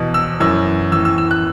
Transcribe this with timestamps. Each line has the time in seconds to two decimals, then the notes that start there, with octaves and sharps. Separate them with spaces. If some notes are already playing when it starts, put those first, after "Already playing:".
Already playing: E2 B2
0.14 E6
0.40 F#2 E3 E6
0.92 E3 E6
0.96 A2
1.05 E6
1.18 E6
1.31 F#6